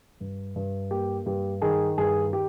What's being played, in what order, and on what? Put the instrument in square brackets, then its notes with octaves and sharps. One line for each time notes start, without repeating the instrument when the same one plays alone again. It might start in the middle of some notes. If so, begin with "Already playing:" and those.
[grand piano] G2
G2
A#3 G4
G2 G4
D#3 G#4
G2 G#4
G4